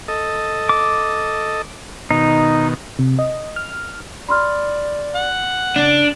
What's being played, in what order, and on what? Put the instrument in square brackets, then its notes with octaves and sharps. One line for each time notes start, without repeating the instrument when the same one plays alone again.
[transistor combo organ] A4 D#5
[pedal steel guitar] D6
[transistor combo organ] B2 D#3 [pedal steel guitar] D#4
[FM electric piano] C3
D#5
F6
[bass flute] D5 [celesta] B5 C6 F6
[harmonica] F#5
[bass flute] C#3 [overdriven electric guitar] D4